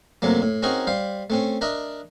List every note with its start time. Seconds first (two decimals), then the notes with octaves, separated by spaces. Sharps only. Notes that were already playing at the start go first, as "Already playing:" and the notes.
0.22 F#2 C3 F#3 A3 A#3
0.42 A2
0.63 C4 C#4 D#4 F#4 G#4 A#4
0.87 G3 C5 F5
1.30 A3 C4 C#4
1.61 D4 A#4 D#5 E5